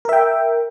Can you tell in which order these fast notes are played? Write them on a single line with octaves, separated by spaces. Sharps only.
A#4 E5 G5